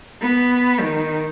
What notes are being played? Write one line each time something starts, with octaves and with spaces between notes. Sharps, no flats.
B3
D#3